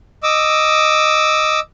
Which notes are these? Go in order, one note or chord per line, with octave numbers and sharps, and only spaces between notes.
D#5 D6 E6